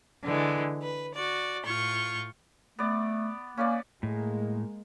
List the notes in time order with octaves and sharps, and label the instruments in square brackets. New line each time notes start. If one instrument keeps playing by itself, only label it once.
[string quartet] D3 E3 G#3
B4
F#4 D5
A2 F4 C#6 G6
[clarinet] A3 [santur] B3 D5
[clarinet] A#3 [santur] C#4 B4 D5
[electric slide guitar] A2 [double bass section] G#3 A#3